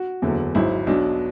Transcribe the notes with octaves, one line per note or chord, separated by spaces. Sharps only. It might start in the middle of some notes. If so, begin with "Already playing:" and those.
Already playing: F#4
F#1 E2 D3 F#3
G#1 G#2 F#3 E4
B1 B2 F#3 D4